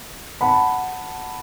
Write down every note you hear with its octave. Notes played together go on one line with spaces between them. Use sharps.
F#5 A5 B5